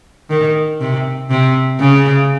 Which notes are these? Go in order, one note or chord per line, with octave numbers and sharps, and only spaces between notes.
D#3
C3
C3
C#3